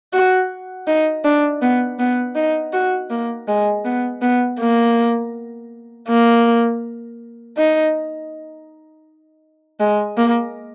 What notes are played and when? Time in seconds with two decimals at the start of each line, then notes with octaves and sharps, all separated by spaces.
0.13 F#4
0.87 D#4
1.24 D4
1.62 B3
1.99 B3
2.35 D#4
2.73 F#4
3.10 A#3
3.48 G#3
3.85 B3
4.22 B3
4.59 A#3
6.09 A#3
7.57 D#4
9.80 G#3
10.17 A#3